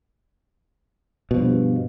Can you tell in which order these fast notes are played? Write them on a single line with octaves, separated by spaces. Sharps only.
B2 F3 G2